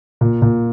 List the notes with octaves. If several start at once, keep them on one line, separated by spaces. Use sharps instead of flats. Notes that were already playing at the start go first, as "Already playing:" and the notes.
A#2
A#2